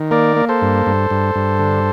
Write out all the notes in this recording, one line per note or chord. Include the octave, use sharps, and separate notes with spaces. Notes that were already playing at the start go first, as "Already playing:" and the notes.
Already playing: D#3
A#3 A#4 D5
A#3
A4 C5
G2
G2
G2
G2
D3